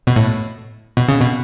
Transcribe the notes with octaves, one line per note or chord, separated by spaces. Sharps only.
B2
A2
B2
C#3
B2